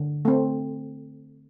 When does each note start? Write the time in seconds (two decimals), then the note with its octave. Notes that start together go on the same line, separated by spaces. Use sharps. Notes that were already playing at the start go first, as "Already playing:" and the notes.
Already playing: D3
0.25 A3 C4